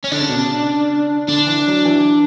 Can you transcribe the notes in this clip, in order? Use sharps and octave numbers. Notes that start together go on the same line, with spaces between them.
C#4
D3 D4
C#3
B2
C#3
D3 D4
E3
F#3
E3